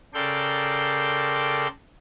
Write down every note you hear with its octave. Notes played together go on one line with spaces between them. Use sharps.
C#3 A4 A#4 D5 G5 C6